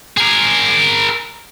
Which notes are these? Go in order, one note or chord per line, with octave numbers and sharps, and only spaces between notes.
G#4 A#4